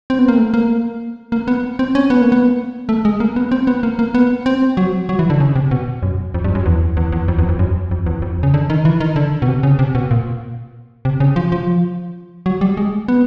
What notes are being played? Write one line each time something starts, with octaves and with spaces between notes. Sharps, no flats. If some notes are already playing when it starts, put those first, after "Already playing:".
C4
B3
A#3
A3
A#3
A#3
B3
C4
C#4
B3
A#3
B3
A3
G#3
A#3
B3
C4
B3
A#3
A#3
B3
C4
F#3
F#3
E3
D3
C#3
C3
B2
F#2
F2
G2
F#2
E2
E2
E2
F2
E2
F2
F#2
F2
E2
F2
C#3
D3
D#3
E3
D#3
D3
B2
C3
C#3
C3
B2
A#2
C3
C#3
F3
F3
F#3
G3
G#3
B3